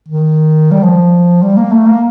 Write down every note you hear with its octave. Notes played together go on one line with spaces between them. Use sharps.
D#3
G3
F3
G3
A#3
A3
A#3